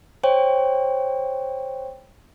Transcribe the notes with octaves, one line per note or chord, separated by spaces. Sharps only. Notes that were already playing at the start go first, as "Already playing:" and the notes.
C5 C#5 G5